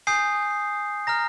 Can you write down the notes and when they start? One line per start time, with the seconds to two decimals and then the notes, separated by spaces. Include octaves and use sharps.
0.07 G#5 D#6 G6 C7
1.07 A#5 F6 A#6